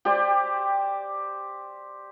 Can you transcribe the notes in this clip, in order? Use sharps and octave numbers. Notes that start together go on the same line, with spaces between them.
G4 C5 D5